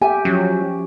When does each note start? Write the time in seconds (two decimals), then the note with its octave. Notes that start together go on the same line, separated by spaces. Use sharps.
0.02 G4 E5 G#5
0.25 F3 F#3 C#4